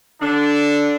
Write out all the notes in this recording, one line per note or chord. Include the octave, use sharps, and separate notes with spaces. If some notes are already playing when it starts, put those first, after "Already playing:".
D3 D4